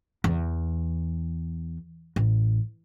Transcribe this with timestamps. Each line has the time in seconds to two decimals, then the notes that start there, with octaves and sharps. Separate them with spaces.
0.24 E2
2.16 A1